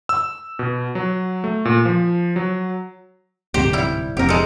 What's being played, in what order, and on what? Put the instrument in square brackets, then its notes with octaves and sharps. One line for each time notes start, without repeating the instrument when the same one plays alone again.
[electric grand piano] E6
B2
F#3
A3
A#2
F3
F#3
[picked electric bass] D1 G#2 C3 [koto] G4 C5
[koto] G3 E4
[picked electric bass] F1 C4 [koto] G4 A#4
[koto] G#3 A4